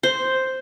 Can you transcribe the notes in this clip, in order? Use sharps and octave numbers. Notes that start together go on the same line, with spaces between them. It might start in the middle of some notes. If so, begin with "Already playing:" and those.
C5